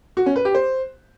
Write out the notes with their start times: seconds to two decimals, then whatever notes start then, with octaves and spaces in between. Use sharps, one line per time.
0.17 F#4
0.26 C#4
0.36 B4
0.45 G4
0.55 C5